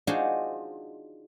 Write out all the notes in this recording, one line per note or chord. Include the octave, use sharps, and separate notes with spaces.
D4 D#4 F4 F#4 G#4 C5